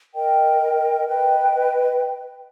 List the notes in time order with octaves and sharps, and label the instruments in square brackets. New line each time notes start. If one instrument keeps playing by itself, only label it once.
[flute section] A#4 D#5 G5
B4 D#5 G5